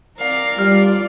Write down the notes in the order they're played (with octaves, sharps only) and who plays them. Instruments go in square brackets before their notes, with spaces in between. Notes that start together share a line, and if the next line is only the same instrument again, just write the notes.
[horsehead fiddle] C4 D5 [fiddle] A#4 F5
[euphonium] G3 [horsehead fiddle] F4 D5 [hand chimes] F6